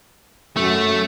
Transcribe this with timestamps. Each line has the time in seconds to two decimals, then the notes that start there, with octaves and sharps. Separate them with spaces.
0.57 F#2 A3